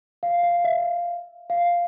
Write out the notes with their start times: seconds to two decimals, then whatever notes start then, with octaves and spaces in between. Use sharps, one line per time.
0.23 F5
0.43 F5
0.64 E5
1.50 F5